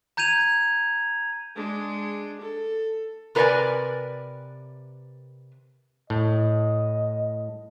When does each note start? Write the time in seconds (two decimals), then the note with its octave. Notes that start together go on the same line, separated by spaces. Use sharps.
0.17 A#5 G6 G#6 D#7 F7
1.56 G#3 D4
2.42 A4
3.35 C3 A#4 B4 C#5 D5 G#5
6.10 A2 D#5